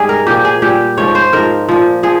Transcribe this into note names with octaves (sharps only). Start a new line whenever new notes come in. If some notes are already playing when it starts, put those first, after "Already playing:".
Already playing: G#2 G3 G#4
A#4
A#2 F3 G4
G#4
A#2 G3 G4
G#2 F3 C#5
C5
G#2 F3 A#4
A#2 F3
F3 G#4